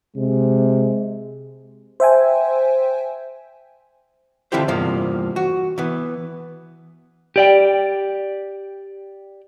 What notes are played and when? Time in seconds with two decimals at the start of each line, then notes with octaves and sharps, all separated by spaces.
0.16 C3 G#3
2.00 C5 E5 G5 G#5
4.52 D3 F3 C4 E4 G4 C5
4.68 E2 G2 C3 F3 A#3
5.36 F#4
5.78 E3 B3
7.36 G4 D5 G5